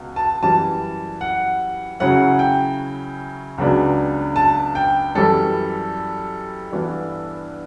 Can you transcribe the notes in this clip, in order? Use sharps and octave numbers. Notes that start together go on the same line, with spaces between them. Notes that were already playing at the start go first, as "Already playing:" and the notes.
Already playing: C#2 B2
A5
F#2 E3 G3 A5
F#5
C#3 F#3 C#4 E4 F#5
G5
C#2 C#3 F#3 B3 D4
A5
G5
F#2 E3 G3 A4
G2 E3 B3 D4